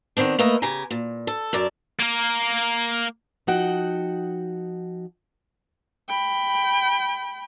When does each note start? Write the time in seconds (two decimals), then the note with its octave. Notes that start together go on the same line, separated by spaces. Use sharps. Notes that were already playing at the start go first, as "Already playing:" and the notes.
0.17 D#3 B3 C4 D4
0.38 A3 A#3 A#4 B4 D#5
0.62 C#3 G4 G#5 A#5
0.90 A#2
1.27 A4
1.53 F#2 A#4 D5 A5
1.99 A#3 A#4
3.47 F3 D#4 F#4 F#5 G5
6.09 G5 B5